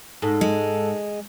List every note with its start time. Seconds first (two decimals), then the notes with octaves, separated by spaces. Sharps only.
0.22 G#2 A4
0.41 G#3